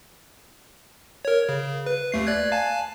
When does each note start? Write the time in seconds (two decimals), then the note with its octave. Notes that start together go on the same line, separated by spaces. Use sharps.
1.25 A#4 C#5
1.49 C#3
1.86 B4
2.12 D#2 A3 C7
2.27 D5 F#6 G#6
2.52 F5 G#5 A5